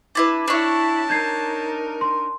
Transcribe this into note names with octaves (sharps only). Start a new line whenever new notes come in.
D4 E4 B4
D4 E4 C#5 A5
D#4 A#4 G6 G#6 C7
C6